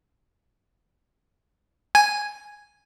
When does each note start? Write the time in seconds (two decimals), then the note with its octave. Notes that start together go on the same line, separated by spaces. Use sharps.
1.95 G#5